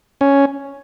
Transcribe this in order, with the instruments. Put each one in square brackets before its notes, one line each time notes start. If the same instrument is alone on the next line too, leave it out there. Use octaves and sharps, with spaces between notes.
[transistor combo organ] C#4